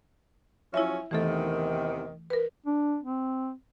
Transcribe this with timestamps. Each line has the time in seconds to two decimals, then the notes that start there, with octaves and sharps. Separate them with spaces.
0.74 F3 F#3 C#4 E4 E5
1.11 E2 C3 D#3 E3 A3 A4
2.30 A#4 B4
2.66 D4
3.04 C4